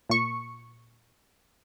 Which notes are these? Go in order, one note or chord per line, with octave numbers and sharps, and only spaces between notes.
A#2 C#6